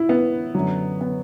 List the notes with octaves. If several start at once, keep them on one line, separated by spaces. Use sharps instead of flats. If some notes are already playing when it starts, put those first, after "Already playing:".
Already playing: A2 E4
B3
F#2 D3 F#3
B3